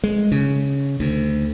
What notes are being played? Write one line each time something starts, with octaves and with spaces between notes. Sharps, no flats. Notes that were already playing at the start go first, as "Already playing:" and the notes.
G#3
C#3
D2